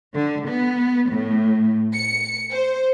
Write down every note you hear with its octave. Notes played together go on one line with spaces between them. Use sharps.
D3
B3
A2
C#7
C5